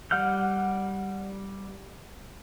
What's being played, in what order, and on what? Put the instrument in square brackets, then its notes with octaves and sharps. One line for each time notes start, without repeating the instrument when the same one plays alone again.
[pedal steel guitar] G3 F#5 F6 G6